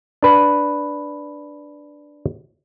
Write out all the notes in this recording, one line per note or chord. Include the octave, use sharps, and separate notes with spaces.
D4 B4